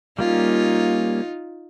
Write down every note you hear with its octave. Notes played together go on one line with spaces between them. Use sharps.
G3 A#3 C#4 D#4 F4